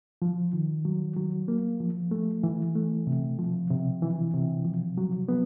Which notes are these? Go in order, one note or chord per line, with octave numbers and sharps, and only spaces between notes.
F3
D#3
F#3
F#3
A#3
F3
A3
E3
A3
C3
F3
C3
E3
C3
F3
F#3
B3